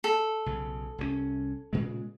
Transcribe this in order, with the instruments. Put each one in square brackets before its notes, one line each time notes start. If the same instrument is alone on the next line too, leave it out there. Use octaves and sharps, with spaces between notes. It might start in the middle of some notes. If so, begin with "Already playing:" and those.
[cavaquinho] A4
[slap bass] B1 C#3
C2 E3 C#4
A#2 C#3 G#3